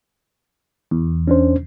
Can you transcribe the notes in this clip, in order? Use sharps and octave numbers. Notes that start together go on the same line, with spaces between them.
E2
C#4 D4 C5